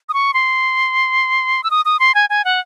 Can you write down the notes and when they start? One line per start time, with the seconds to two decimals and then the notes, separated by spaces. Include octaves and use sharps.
0.09 D#6
0.14 C#6
0.34 C6
1.64 E6
1.70 D#6
1.85 D#6
1.99 C6
2.14 G#5
2.29 G#5
2.44 F#5